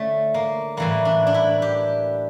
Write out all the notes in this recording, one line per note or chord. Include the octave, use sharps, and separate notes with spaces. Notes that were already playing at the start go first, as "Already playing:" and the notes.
Already playing: D3 A3 C#4
A#3
A2 E3 G3 A#3
D4
D4
E4
G4